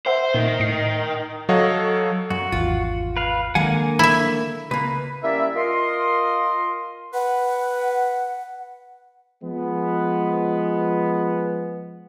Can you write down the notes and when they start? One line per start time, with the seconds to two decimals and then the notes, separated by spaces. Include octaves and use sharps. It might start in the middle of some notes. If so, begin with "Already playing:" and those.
0.06 C5 E5 F#5
0.34 A#2 D#3
0.60 A2 C7
1.49 F#3 A4 C#5 D#5 F5 F#5
2.30 F#2 F#4
2.52 G#1 E2 F4
3.17 B4 F5
3.55 D3 D#3 F#3 G#3 A#3 F5 F#5 G#5
3.99 E4 E5
4.71 C#2 A#3 B4
5.23 G3 A#3 C#4 E4 D5 E5
5.55 F4 A#4 D#5 C6
7.14 B4 F#5
9.43 F3 G#3 B3